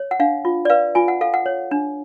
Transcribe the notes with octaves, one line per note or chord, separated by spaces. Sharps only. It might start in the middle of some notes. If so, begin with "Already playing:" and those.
Already playing: C#5
F#5
D4 F5
F4
D5
B4 F5
F4 G#5
F#5
A4 F5
F#5
C#5
D4